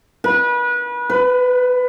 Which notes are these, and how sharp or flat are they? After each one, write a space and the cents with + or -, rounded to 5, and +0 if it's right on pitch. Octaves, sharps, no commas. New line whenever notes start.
B4 -30
B4 +20